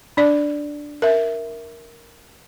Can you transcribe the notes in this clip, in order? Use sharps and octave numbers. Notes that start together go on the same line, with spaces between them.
D4 D5
A#4 E5